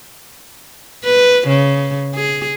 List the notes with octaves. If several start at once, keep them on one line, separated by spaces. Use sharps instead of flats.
B4
C#3
G#4